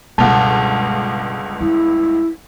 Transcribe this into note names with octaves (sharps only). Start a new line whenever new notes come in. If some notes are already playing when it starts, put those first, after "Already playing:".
G1 C#2 B2 G#3 F#5 A5
G#3 A#3 E4